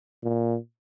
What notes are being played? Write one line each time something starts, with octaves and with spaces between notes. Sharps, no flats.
A#2